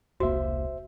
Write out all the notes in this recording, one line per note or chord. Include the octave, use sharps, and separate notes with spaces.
E1 C2 A#3 F#4 C5 E5